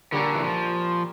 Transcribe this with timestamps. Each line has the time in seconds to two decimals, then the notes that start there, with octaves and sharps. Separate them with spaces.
0.12 A#2 D3 G3 C#4 G4 A#4
0.35 E3
0.43 F3